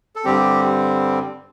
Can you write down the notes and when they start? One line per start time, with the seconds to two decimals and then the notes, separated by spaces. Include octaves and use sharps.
0.16 A4
0.25 G2 D3 G3 C4 G4